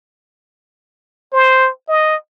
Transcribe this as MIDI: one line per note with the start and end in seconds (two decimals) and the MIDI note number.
1.33 1.70 72
1.89 2.15 75